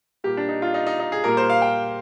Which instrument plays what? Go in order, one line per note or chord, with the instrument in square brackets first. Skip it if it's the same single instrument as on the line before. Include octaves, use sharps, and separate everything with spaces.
[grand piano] A#2 G3 A#3 G4
D4
D#4
F4
D#4
D#4
D#4
G#4
A#2 G3 A#3 A#4
C5
F5
G5